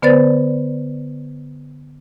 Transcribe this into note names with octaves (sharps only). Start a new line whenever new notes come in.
D3 B3 B4 C5 D5 A6